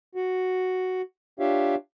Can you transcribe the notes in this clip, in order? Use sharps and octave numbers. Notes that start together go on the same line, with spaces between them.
F#4
D4 F4 G4 C#5 E5 F5